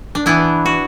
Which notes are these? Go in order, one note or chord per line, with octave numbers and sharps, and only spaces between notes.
D4
E3 B3 D4 E4
F#4